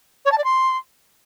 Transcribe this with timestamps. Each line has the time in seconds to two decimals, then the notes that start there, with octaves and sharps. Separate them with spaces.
0.25 C#5
0.31 A5
0.37 D5
0.44 C6